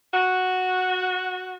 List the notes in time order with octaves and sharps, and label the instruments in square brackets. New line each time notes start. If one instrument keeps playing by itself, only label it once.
[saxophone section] F#4